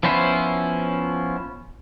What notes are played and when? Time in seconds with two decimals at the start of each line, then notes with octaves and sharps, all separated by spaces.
0.03 F3 B3 C#4 E4 C5